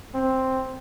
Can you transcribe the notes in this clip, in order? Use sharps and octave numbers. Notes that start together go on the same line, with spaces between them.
C4